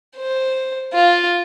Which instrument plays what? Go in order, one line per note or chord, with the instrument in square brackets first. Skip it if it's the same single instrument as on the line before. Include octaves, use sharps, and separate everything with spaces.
[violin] C5
F4